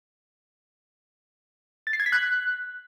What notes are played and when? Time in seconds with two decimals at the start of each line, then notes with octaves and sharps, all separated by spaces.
1.87 A6
1.93 C7
2.00 G#6
2.06 B6
2.12 F#6